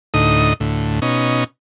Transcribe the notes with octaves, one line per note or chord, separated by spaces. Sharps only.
D2 A2 D#4 D#6
D2 A2
B2 C#4 D#4